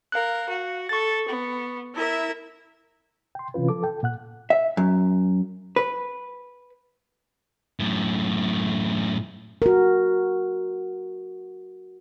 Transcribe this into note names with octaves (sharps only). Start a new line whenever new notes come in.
A#4 F5 F#6
F#4
A4 C#6 A6
B3
E4 A#4 E5
G5 C6
C3 E3 C#4 F4 B4
F3 A4 D6
A4 G5
A#2 F#5 F#6
E5
F#2
B4
F#2 A2
F#4 A#4